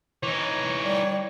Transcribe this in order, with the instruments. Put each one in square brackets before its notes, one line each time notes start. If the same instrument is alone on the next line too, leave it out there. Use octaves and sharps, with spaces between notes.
[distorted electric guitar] E3 D#4 [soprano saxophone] C#5
[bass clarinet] G3 [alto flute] D5